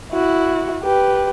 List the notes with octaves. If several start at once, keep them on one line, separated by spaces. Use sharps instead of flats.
E4 F#4
G4 B4